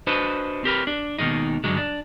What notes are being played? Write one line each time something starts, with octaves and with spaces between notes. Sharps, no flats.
D4 F#4 B4 C5 D#5
C4 G4 A#4 B4
D4
D#2 B2 D#3 G#3 D#4
G2 D3 F#3 G#3
D4